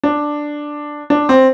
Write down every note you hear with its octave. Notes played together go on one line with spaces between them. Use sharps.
D4
D4
C4